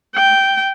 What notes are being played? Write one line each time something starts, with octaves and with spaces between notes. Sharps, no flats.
G5